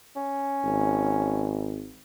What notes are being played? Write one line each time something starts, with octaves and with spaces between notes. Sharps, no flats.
C#4
G#1